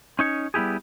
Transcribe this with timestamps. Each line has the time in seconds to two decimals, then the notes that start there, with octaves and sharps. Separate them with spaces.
0.19 C#4 D#4 C#5
0.54 G3 B3 E4 G4 G#4